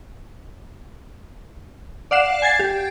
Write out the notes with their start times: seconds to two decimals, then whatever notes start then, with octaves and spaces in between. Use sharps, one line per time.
2.11 D5 F5 F#5 C7 E7
2.42 G#5 G#6 A6 C7
2.59 G4